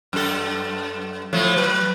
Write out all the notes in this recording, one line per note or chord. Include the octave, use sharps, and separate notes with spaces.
F#2 A4
A2 F3 A3
F#3 B4